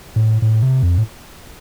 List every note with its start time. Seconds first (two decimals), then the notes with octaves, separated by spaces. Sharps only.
0.16 A2
0.42 A2
0.62 C3
0.83 F2
0.98 A2